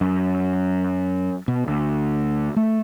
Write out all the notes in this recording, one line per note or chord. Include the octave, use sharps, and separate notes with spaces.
F#2
B2
D2
A3